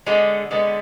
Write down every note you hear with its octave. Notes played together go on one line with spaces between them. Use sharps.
D3 G#3 B3
D3 G#3 B3